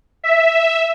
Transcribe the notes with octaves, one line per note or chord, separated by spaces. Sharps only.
E5